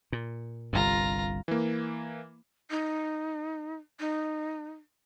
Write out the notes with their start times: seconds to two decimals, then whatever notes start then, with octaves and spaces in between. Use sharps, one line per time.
0.12 A#2
0.73 G1 C2 G2 F4 A#5
1.48 E3 A#3
2.70 D#4
4.00 D#4